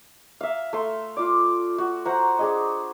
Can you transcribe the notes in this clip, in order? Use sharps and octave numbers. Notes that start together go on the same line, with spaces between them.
E5 F5
A3 C6
F4 D5
F#4
F#4 C5 F#5 A#5
D4 G#4 D#5